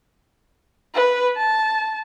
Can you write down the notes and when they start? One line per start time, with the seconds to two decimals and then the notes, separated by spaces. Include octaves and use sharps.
0.95 B4
1.37 A5